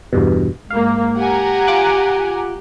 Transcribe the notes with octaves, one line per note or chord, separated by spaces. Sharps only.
E2 G2 B2
G#2 A#3 F5
G4 F#5 G#5 A#5
F4 D6 F#6